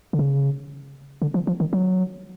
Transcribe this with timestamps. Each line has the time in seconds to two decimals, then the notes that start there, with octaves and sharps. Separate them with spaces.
0.13 D3
0.19 C#3
1.22 D3
1.34 F3
1.47 F3
1.60 D#3
1.73 F#3